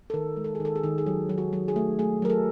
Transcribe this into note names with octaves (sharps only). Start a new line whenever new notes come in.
A4
D#3 A#4
G#3
A4
G#4
D#3
A4
G#4
D#3
G#4
F#3 G4
F#3
F#4
F#3
G#4
A3
A3 G#4
F#3 A#4
A4